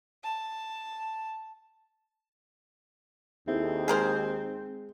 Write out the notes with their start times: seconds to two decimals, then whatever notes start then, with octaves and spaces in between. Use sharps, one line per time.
0.24 A5
3.48 D#2 C4 E4 G#4 A4
3.88 G#3 G#4 A#4 C5